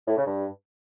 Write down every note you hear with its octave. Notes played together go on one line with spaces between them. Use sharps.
A2
C#3
G2